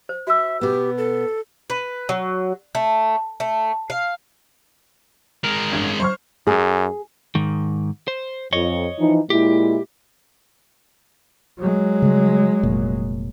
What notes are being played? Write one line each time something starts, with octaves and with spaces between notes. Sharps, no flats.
C5
F#4 E5 E6
B2 B3 G4
A4
B4
F#3
A3
A3
F5
G#3 A#4
A1 G2 G#6
C5 C#6 F6
F#2 G#4
G#2 D#3
C5
F2 C#5 D#5
E3 F3 D#4
A#2 G#3 E4 G4
F#3 G#3
C#3 G3
F1 A#2